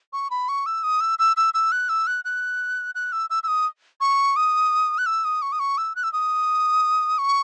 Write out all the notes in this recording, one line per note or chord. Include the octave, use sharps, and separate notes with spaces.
C#6
B5
C#6
E6
D#6
E6
E6
E6
E6
F#6
E6
F#6
F#6
F#6
E6
E6
E6
D#6
C#6
D#6
F#6
E6
D#6
C#6
D#6
C#6
E6
F#6
E6
D#6
C#6